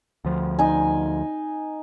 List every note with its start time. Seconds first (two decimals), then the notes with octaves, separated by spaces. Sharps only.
0.25 D2 F3
0.59 D#4 G#5